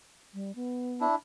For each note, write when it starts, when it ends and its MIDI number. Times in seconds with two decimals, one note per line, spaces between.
0.34 0.52 55
0.55 1.06 59
1.01 1.15 62
1.01 1.15 64